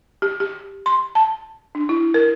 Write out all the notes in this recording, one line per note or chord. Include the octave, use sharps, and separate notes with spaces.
G4
G4
C6
A5
D4
E4
A#4